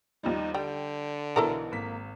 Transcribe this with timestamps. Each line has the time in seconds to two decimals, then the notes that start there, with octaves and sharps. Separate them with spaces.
0.23 D#2 F3 G3 D#4
0.54 D3 G3 G5
1.36 B1 B2 E3 E4 A4 A#4
1.72 G#1 A#3 B6